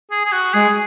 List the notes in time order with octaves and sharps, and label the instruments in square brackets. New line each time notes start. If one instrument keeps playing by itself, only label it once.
[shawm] G#4
G#4
F#4
[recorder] G#3 [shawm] G#4